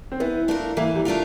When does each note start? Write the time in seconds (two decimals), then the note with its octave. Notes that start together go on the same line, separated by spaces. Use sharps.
0.12 C4
0.20 E3 B3
0.48 A3 D4 F4 A#4
0.77 E3 A#3
0.95 G3
1.05 A3 D4 F4 A#4